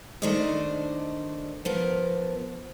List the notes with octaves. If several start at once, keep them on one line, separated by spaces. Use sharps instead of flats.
D#3 A3 D4 C5 D5 D#5
F3 B3 A#4